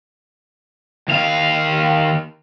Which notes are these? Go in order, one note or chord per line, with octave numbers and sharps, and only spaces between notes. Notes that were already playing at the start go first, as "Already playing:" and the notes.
D#2 F5